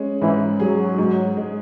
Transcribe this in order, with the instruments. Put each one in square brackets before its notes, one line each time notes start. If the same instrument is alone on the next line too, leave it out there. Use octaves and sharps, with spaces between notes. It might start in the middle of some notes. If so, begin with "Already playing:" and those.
Already playing: [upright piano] G#3 C#4
[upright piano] G#2 [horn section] E3
[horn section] F#3 [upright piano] G#4
[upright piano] G#2
G#3